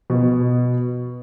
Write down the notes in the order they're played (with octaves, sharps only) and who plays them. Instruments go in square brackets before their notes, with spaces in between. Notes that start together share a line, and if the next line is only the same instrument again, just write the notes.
[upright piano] B2